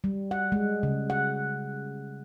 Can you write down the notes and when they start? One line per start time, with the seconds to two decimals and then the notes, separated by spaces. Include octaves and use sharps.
0.04 G3
0.31 F#5
0.52 G#3
0.83 C#3
1.10 F#5